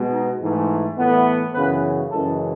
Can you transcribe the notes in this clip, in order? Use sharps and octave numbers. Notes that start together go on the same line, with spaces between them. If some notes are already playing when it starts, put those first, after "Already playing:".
Already playing: B2 G#3 B3
D#4
G#2 E3 A3
A2 E3 B3
F#2 C#3 E3 B3 B4
F#2 C#3 E3 G#3 A4